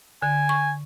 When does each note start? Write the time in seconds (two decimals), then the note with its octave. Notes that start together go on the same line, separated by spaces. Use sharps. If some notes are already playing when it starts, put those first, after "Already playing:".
0.22 D3 G#5
0.49 C#6